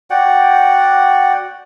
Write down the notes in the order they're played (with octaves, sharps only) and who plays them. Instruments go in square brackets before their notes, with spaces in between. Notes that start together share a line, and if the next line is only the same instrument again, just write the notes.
[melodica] F#4 D5 F#5 G5